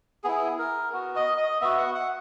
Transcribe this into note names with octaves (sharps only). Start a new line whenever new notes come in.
B3 E4 G#4
A#4
B3 F#4
D#5
D#5
B3 F#4 E5
F#5
F#5